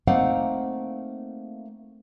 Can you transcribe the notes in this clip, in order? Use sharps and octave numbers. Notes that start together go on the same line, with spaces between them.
A3 A#3 C4 D#4 F5 F#5